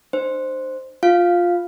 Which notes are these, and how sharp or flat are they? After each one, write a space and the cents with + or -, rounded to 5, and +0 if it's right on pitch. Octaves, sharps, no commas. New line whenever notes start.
D4 +45 C5 +0
F4 +10 F5 +0